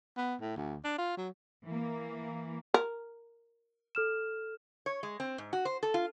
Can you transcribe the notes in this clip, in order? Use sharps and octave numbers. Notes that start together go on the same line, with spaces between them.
B3
A2
D2
D4
F4
F#3
E3 A#3
A#4
A4 F6 E7
C#5
G#3
C4
G#2
F#4
C5
A4
F4